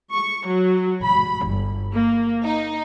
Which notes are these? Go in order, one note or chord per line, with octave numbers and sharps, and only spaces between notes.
C#6
F#3
B5
G1
A#3
D#4